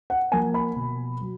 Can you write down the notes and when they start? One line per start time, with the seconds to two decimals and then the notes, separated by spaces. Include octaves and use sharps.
0.10 F#5
0.32 F3 A#3 G#5
0.54 B5
0.76 B2
1.21 F#3